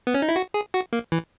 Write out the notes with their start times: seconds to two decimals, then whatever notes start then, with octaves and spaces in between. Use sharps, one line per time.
0.07 B3
0.14 C#4
0.22 D#4
0.29 E4
0.36 F#4
0.54 G#4
0.74 F#4
0.93 A#3
1.12 E3